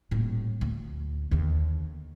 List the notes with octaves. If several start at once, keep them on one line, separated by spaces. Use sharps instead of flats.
D#1 A2
D2
D#2 D3